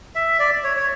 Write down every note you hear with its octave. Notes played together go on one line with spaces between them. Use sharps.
E5
D5
C#5
C#5